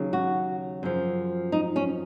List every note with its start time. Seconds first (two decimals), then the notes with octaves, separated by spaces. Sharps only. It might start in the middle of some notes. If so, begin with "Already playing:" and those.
Already playing: D#2 C#3 F#3
0.13 F#4
0.83 F#2 F3
1.52 D#4
1.76 C#4